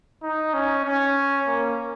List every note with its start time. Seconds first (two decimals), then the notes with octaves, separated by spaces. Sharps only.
0.22 D#4
0.54 C#4
0.85 C#4
1.47 A#3